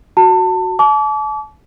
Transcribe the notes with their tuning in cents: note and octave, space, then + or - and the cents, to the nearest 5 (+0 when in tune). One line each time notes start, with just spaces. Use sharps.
F#4 +0 A5 +25
A5 -40 D6 -35